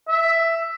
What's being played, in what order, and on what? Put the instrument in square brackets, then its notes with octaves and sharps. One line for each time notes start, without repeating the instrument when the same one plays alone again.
[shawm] E5